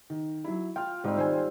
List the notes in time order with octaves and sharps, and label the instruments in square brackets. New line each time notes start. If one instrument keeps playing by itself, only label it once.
[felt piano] D#3
F#3 E4
[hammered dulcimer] F4 F5 [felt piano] G5
[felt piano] G#2 [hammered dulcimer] G3 C4
[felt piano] D#3 C5 G#5 [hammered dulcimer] C4